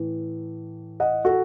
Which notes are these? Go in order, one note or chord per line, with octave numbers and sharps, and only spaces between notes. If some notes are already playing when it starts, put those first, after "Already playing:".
Already playing: A2 E3
D#5 F#5
F#4 A4